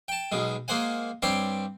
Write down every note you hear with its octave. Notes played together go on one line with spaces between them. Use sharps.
G5 A5
B1 B2 G#3
G#3 A#3 C5 F#5 G#5
G2 C4 C#5 D5 G5 C6